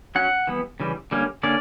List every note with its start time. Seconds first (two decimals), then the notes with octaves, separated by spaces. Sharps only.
0.15 F#3 C#4 F#5
0.47 E3 G3 B3
0.80 C#3 E3 G3
1.11 D3 G3 A#3 C#4
1.43 D3 A#3 C#4 D5